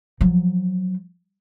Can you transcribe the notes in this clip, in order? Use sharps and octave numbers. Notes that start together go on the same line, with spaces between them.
F3 F#3